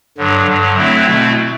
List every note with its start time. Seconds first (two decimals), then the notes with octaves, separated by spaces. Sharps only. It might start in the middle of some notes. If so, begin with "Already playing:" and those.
0.18 G2 D3 F#3
0.47 G2 D3 F#3
0.77 D3 F#3 A3 C4 E4
1.07 B2 A3 C4 E4